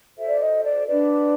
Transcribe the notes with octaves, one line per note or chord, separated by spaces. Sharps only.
F#4 A4 C5 E5
D5
D#5
D5
D4 F#4 B4 D5